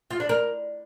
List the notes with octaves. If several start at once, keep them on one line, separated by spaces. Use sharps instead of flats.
F4
D4
A#4